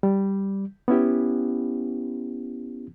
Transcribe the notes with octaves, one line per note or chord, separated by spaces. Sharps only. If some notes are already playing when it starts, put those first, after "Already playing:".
G3
B3 C#4 E4 G4